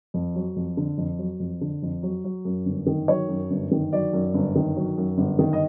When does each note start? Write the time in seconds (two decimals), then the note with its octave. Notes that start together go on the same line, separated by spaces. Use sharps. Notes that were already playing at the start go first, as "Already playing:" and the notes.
0.14 F2
0.36 F#3
0.56 F2
0.77 D3
0.98 F2
1.19 F#3
1.40 F2
1.61 D3
1.83 F2
2.03 F#3
2.24 F#3
2.45 F#2
2.66 G1
2.87 D#3
3.08 F#3 C#5
3.29 F#2
3.50 G1
3.71 D#3
3.93 F#3 D5
4.13 F#2
4.34 G1
4.56 D#3
4.76 F#3
4.97 F#2
5.18 G1
5.39 D#3
5.53 D#5